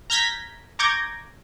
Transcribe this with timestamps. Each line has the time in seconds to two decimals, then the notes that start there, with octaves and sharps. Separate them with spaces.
0.10 A#5 F6 G6 G#6 A#6 B6
0.79 A#5 C#6 D6 G6 G#6 A#6